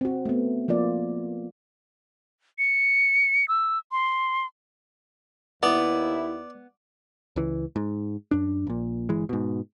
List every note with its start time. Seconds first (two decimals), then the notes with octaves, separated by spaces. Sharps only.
0.01 C4 F#4
0.26 A3 B3
0.68 F3 A#3 F4 D5
2.59 C#7
3.48 E6
3.92 C6
5.63 D#2 B3 E4 D5
7.36 C#2 E3
7.76 G#2
8.31 F#2 D4
8.67 A#1 A#2
9.09 G1 E3 G#3
9.29 G#2 B2